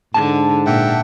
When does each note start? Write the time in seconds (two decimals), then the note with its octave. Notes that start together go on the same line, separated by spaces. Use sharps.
0.14 G#2 D3 A5
0.66 A#2 E5 F#5 G5